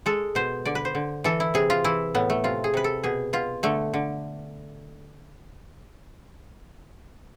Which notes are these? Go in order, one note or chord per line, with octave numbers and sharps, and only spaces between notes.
G#3 A4
B2 C5
D3 D5
B4
C5
D3
E3 A4
E4
C3 G#4
F4
E3 E4
A2 B3
A3
C3 F4
G#4
C3 B4
A4
B2 G#4
B2 F4
D3 A3
D3